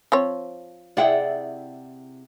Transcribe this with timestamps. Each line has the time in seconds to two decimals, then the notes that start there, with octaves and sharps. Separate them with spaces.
0.12 F3 C4 C#5
0.97 C3 E4 G#4 D5 F#5 G5